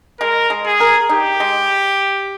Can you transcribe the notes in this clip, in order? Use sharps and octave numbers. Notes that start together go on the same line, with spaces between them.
G#3 A#4
G#3
G#4
A#4
D#4 G4
G#3